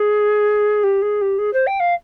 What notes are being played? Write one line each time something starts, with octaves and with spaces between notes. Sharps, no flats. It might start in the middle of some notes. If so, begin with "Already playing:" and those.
Already playing: G#4
G4
G#4
G4
G#4
C5
G5
F5